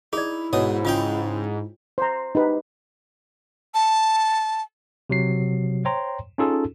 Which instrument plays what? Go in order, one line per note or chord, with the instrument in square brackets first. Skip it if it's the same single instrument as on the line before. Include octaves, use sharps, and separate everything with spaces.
[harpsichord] D#4 [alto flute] E4 [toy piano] G#4 D5
[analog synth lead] G#2 [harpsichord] B2 D#6 [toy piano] C#5
[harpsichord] C#3 D#4 G5 [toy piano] F4
[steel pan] C5 A#5
D#4 G4 B4
[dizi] A5
[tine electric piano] C3 F#3 C7
C5 C#5 G5 A#5 C6
C#4 D#4 F4 G#4 A4